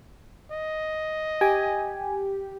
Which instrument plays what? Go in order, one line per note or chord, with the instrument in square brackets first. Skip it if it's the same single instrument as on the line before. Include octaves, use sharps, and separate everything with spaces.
[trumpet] D#5
[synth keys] G4 [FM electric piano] G#5